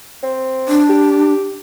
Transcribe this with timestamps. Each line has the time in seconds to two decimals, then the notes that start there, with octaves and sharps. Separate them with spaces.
0.23 C4
0.69 D4
0.89 G4